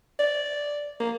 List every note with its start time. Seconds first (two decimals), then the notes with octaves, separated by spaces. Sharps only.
0.19 D5
1.00 A#3